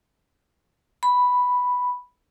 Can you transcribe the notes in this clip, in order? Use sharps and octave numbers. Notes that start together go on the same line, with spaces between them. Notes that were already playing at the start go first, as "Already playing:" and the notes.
B5